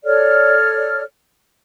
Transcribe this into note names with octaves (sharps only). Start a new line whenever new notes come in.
A4 C#5 D5 F6